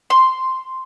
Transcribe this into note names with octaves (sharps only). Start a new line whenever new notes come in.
C6